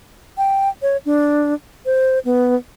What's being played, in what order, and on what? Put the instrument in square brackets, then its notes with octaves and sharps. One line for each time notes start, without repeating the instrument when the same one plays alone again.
[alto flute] G5
C#5
D4
C5
B3